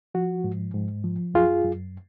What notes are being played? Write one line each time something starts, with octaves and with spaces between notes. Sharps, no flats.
F3 F#4
G#2
G#2
F3
F#2 F4 G#4
F#2